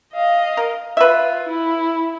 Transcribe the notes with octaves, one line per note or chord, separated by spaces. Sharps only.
D#5 F5
A#4
F4 B4 E5
E4